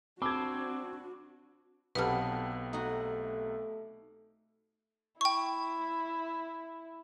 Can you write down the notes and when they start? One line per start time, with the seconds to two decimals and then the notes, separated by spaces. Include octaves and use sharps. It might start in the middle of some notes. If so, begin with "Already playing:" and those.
0.22 C4 D4 F#4 A5 B5 D6 E6 G#6
1.95 B1 C3 B3 G4 A4 B4 F6
2.73 A3 D#4 F#4
5.21 E4 G5 C#6